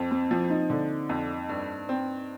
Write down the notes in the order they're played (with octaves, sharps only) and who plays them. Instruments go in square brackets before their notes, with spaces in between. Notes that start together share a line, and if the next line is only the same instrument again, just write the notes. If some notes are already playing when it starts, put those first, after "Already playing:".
Already playing: [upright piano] F2 [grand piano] C4
[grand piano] C4
[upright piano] F3 [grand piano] C4
[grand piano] D#4
[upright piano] D3
F2
G2
C4